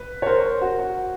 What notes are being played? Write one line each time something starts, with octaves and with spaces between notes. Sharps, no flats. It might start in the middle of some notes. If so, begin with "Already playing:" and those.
Already playing: B4
C#5
A#4 C5
F#4
F#4